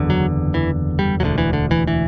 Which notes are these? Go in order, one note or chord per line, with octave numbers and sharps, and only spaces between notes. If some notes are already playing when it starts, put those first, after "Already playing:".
Already playing: F#1 E2 D3
F#3
E3
G3
E1 D2 D3 F#3
E3
D3
E3
E3